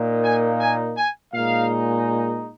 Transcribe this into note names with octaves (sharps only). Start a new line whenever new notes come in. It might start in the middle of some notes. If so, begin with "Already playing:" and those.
Already playing: A#2 A#3 D#4
G#5
G#5
G#5
A#2 G#3 D#4 F5